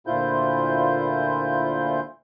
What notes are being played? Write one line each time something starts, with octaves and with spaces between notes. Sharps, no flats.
D2 A#2 E4 F4 C5 G6